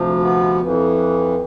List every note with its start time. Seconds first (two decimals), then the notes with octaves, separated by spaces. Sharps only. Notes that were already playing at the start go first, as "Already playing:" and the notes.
Already playing: D2 C3 F3
0.21 B3
0.60 F2 E3